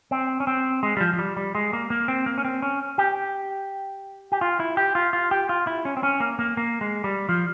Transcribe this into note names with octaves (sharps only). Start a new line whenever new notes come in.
C4
C#4
C4
G#3
G3
F3
F3
G3
G3
G#3
A#3
A#3
C4
A#3
C#4
C4
C#4
G4
G4
F4
E4
G4
F4
F4
G4
F4
E4
C#4
C4
C#4
A#3
A#3
A#3
G#3
G3
F3